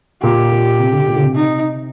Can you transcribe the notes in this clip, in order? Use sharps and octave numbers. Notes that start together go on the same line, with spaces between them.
A#2 G4
A#2
C3
D3
A#2
D3
C3
D#4